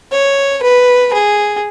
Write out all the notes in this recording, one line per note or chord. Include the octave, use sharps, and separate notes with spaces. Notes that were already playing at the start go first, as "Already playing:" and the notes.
C#5
B4
G#4